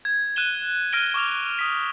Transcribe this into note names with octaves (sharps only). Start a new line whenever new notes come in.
G#6
F#6 D#7 E7 G7
F6 F#6 A#6 D7 D#7 G7
C#6 D6 F6 F7
D#6 B6